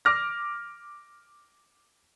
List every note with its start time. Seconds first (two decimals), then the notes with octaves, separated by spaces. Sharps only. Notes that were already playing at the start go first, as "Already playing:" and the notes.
0.05 D6 F6 A#6